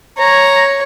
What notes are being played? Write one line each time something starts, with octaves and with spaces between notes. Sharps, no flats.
C#5 A#5